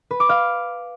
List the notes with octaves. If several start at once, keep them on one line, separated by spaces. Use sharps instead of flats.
B4
D6
F5